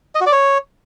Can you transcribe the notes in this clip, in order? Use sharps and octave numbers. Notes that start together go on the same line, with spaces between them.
D#5
F#4
D5
C#5